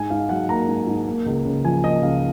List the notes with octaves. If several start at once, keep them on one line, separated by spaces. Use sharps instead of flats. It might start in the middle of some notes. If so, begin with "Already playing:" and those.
Already playing: G#2 G#5
G#2 F5
F#3 F#5
A#3 A#5
G#2
G#2
A#3
C#2
C#3
F3 G#5
A#3 D#5
C#2 F5